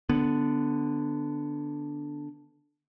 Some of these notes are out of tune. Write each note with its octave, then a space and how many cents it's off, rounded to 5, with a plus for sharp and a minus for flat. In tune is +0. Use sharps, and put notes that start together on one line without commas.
D3 +0 B3 +0